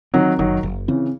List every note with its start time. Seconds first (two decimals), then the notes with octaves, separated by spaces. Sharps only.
0.14 D#3 F#3 C4
0.39 F#1 D#3 F#3
0.63 F#1
0.88 C#3 E3 C4